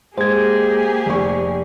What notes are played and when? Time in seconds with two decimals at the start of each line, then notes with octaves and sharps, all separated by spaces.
0.18 G#3 A#3 G4 G#4 C5 G#6
1.06 F1 C#6